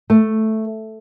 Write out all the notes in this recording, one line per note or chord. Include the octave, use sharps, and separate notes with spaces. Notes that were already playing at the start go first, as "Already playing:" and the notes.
A3